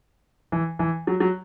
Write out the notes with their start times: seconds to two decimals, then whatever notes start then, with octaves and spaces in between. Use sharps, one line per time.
0.52 E3
0.79 E3
1.07 F#3
1.20 F#3